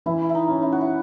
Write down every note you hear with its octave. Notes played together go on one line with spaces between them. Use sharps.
E3 E4
E4
D#4
C#4
E4
F#4
E4